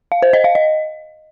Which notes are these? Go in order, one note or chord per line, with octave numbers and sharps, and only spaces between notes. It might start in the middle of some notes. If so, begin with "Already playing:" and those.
F5
C5
D#5
F5
D#5